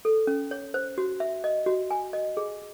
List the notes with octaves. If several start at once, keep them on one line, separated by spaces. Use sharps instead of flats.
A4
C#4
C#5
C5
F#4
E5
D#5
F#4
G#5
D#5
G#4